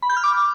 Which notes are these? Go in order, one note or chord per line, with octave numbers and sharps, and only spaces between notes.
B5
G6
F6
D6